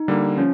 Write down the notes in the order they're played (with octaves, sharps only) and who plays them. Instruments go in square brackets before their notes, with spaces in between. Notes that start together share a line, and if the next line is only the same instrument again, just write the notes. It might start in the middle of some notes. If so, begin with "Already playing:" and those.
Already playing: [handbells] D#4
[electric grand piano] D3 G3 A#3
[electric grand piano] F3 [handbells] C#4